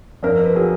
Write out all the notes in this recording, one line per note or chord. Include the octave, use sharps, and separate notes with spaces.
F2 A#4
B4
F#3 G#4